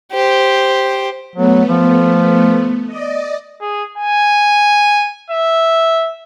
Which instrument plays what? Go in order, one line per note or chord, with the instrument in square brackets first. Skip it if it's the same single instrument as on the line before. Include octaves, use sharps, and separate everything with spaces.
[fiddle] G4 C5
[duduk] F#3 [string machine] A3 B3
[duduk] F3
[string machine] D5 D#5
[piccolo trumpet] G#4
G#5
E5